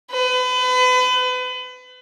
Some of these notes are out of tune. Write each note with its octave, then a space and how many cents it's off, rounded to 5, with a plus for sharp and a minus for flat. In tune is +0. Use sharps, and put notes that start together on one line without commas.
B4 +35